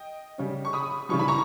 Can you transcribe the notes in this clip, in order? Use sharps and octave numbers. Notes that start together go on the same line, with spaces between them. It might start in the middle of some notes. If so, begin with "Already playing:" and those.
Already playing: D#5 G5
C#3 G3 C#4
C#6
B5 D#6
C#3 E3 G3 C#6
B5
A#5 C#6